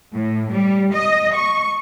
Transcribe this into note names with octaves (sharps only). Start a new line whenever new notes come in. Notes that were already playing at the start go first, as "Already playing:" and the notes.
A2
G3
D#5
C#6